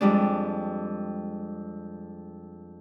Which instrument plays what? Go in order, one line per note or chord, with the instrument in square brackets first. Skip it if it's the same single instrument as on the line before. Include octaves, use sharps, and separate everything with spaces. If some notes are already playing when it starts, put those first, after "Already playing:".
[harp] F2 G3 G#3 D4